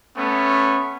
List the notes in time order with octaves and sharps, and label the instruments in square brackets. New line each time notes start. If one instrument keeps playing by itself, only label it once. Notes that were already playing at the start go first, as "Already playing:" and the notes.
[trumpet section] A3 B3 C#4